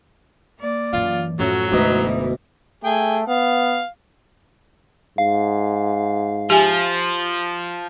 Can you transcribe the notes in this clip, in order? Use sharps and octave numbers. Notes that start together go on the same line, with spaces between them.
A#3 D5
F#2 E3 F4
F#2 A2 F3 F#3 A3 C#4 F#4
F#1 D2 B2 E3 G#3 A3 D#4
A3 G#4 G5
B3 F5
G#2 F5
F3 G4 E5 G#5